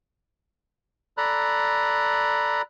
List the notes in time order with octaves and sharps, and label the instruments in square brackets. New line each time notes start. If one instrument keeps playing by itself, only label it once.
[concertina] A4 D5 A#5 B5 F#6